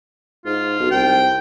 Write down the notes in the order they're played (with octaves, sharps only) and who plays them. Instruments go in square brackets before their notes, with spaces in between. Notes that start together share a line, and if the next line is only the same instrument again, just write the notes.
[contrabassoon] G#2 [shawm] F4
[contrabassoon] B1
[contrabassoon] C2 [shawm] G5